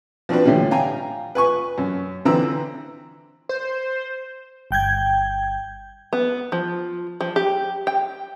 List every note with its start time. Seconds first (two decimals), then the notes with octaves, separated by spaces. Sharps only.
0.29 F3 C4 D4 F#4 B4
0.45 A2 D3 E3 G3
0.71 F5 G5 G#5 A#5
1.35 B4 G#5 C#6
1.78 F#2
2.25 D3 E3 C4 B4 A#5 E6
3.49 C5
4.71 G1 G5 G6 G#6
6.13 B3
6.52 F3
7.21 F3
7.36 G4
7.87 G5